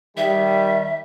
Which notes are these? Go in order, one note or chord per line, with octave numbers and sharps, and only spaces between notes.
D#3 G3 E5